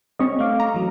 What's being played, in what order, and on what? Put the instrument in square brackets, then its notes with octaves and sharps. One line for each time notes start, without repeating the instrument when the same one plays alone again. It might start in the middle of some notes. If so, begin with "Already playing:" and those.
[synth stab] G3 C4 C#4 [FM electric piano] D#5 C#6
[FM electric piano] A3 F5 D6
[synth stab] A#5
[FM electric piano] E3 F#3